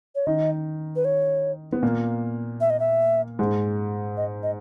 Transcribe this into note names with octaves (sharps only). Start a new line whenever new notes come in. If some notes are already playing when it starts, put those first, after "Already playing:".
C#5
D#3 D#4 D#5
B4
C#5
B3
A#2 A#3
E5
D#5
E5
G#2 G#3
D#5
D#5